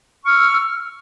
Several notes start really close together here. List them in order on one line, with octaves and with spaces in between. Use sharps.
C#6 F6 E6